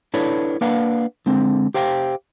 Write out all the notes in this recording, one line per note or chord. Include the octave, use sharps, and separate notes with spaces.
D4 E4 A4 B4 C#5
A#3 D4 B4 F5 F#5
D3 G#3 C4
G4 C5 F5 G5